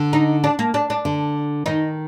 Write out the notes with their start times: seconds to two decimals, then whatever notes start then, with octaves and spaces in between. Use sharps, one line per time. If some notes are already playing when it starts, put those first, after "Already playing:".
Already playing: D3
0.13 D#4
0.44 D4
0.59 A#3
0.74 D4
0.90 D4
1.05 D3
1.66 D#3 D#4